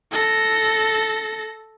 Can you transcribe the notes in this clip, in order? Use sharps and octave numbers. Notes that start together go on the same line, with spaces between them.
A4 A#6